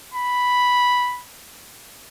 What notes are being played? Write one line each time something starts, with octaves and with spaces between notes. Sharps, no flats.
B5